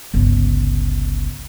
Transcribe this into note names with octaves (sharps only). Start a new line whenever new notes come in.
G1 C#2